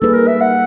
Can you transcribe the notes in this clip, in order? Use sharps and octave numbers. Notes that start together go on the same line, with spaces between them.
G3 A#3 D#4 G#4 A4 B4
A#4
E5
F#5